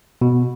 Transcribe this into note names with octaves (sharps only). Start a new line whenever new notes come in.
B2